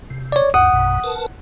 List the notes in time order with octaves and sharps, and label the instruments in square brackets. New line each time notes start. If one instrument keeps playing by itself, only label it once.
[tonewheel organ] C3
[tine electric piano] C#5 D5
[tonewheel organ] D2 G2 [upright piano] F#5 [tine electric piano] D#6
[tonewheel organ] A#1 F#2 B2
A#4 B4 A5